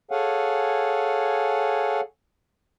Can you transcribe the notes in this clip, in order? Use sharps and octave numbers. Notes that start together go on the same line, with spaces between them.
G#4 A4 C#5 F5 F#5 G#5